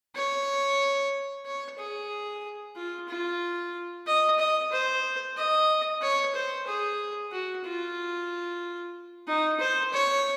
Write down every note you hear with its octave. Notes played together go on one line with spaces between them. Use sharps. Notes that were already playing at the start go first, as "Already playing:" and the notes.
C#5
C#5
G#4
F4
F4
D#5
D#5
C5
D#5
C#5
C5
G#4
F#4
F4
D#4
C5
C#5